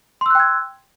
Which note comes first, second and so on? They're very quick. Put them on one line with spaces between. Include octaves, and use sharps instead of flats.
C6 E6 F#6 G5 G#6